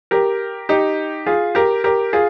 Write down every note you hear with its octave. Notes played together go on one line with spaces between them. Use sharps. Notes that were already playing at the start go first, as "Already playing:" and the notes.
G4 A#4
D#4 G4
F4 G#4
G4 A#4
G4 A#4
F4 G#4